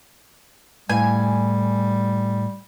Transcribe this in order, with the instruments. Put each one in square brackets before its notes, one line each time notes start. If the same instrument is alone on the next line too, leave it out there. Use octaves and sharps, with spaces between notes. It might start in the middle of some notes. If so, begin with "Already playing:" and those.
[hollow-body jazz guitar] A2 F5 [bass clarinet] G3 [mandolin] G#5